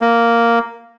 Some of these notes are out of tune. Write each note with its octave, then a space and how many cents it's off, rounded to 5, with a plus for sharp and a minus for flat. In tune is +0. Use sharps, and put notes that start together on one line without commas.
A#3 -5